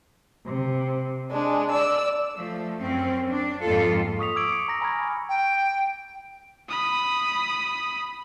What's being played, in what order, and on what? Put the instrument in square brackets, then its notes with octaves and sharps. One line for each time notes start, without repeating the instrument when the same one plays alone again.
[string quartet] C3
[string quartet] G#3 [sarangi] D4
[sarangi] D5 [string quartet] E6
[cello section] F3 A3
F#2 C4 C#4
D4
F2 G#2 A#3 F4 A4
[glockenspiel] C#6 D#6 B6 F7
C#6 D6 E6 G#6 D7 F#7
D6 C#7
A#5 A#6
G#5 A#5 B5 C#6 F6 G#6
[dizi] G5
[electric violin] B5 D#6